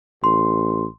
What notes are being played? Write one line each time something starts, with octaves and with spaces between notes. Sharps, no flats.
A1 C6